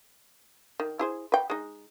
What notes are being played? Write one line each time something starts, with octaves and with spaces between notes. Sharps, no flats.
D#3
E4 G#4 C5
B4 G5
G#3 D#4